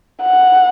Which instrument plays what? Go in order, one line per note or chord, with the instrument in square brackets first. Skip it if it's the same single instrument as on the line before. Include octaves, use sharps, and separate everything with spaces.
[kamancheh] F#5